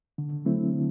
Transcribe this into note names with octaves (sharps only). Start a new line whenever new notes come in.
D3
F#3 A3 C4 E4
D3